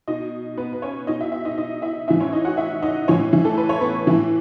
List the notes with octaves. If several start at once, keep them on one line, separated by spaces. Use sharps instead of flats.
B2 D#4 D#5
B3 B4
B4
C#4 C#5
B2 D#4 D#5
E4 E5
E4 E5
D#4 D#5
D#4 D#5
E4 E5
A2 E3 E4 E5
C#4 C#5
D#4 D#5
F#4 F#5
E4 E5
D#4 D#5
A2 E3 C#4 C#5
E3 E4
A3 A4
B4
C#5
B3 B4
A2 E3 E4